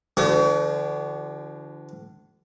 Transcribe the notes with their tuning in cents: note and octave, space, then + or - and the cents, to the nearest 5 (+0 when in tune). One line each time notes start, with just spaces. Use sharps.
D3 +0 F3 -45 F#4 +40